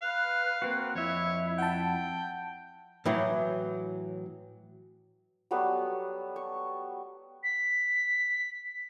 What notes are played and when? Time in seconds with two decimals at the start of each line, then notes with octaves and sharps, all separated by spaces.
0.02 B4 F5 F#6
0.62 A#3 C4 F#4
0.95 F2 E4 C#5 E5
1.58 F#5 G5 A5
3.06 A2 E3 F#3
5.51 F#3 G3 A3 B3
6.36 C#6
7.44 B6